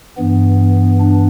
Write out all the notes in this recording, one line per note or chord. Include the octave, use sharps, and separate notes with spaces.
G2 E3 B3
D4